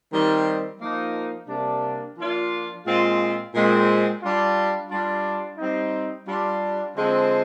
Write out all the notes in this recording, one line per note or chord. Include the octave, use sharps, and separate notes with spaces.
D#3 G3 C4
F3 A#3 D#4
C3 G3 A#3 D4
F3 A#3 D4 F4
A#2 G#3 C4 F4
A#2 G#3 C4
G3 D4 F4
G3 D4 F4
G3 C4 D#4
G3 D4 F4
D3 F3 G#3 C4